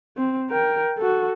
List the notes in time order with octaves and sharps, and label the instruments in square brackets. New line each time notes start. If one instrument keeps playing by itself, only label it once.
[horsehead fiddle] C4
A#4 G5
F#4 A4